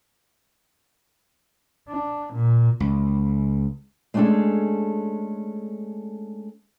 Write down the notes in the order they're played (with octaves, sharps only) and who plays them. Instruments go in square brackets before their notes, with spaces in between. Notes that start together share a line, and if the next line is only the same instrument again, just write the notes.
[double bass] D4
A#2
[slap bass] C#2
[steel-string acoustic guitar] G#3 A3 C#4 D4 G#4 A4